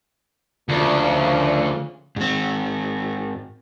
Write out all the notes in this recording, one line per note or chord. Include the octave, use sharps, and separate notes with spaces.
D2 A#2 C#3 F3
G#2 C4